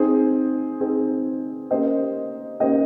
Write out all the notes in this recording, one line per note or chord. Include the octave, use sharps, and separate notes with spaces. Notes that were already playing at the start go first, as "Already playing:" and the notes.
Already playing: C4 D#4 G#4
C4 D#4 G#4
A#3 C#4 G4 C5 D#5
A#3 C#4 G4 C5 D#5